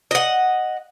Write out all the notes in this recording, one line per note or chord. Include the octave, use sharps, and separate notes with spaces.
D#5 F#5